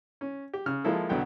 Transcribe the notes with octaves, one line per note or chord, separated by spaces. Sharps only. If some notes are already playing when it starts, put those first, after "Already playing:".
C#4
G4
C#3 F6
F3 G#3 A#3 E4 A4
B1 D3 F#3 B3 G5